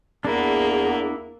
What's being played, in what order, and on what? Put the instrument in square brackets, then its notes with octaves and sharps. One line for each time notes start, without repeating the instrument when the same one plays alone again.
[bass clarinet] E2 [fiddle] A#3 [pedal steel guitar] D4 E4 [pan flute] G#4